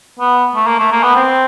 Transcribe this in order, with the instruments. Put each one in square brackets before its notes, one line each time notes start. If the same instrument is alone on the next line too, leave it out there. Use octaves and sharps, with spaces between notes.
[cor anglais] B3
A3
A#3
A3
A#3
B3
C4